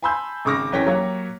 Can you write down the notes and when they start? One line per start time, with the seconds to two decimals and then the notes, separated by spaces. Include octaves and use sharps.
0.02 G#5 A5 B5 C6 E6 G6
0.45 G#1 C#3 C#6 D6 F6 A#6
0.72 F#1 E3 C#4 G5 A#6 B6
0.86 F#3 A#3 G4 C#5